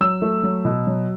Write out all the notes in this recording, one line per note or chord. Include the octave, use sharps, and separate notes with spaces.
F#3 E6
A3
F#3
B2
F#3